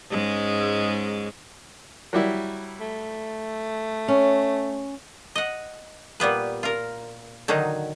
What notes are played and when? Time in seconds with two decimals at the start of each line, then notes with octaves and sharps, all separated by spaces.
0.11 G#2 G#3 C#4
2.13 F#3 G3 E4
2.81 A3
4.08 C#4
5.35 D#5 F#5
6.20 A#2 G3 B3 B4
6.63 F4 A#4
7.48 D3 D#3 F#3 D#4